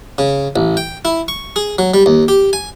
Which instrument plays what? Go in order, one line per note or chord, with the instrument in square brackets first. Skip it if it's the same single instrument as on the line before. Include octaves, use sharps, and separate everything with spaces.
[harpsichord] C#3
A1
G5
E4
C#6
G#4
F#3
G3
D#2
G4
G#5